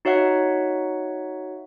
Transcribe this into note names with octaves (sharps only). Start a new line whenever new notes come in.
D#4 F#4 C#5 E5 F#5